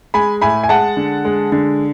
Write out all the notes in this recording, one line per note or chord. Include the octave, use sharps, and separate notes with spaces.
G#3 G#5 B5
A2 G#5 B5
G#5
G#3 F#5 A5
D3
G#3
D3